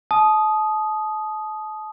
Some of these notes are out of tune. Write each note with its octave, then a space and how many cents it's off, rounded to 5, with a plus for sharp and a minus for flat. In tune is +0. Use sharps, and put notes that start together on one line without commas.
A5 -35 D#6 +0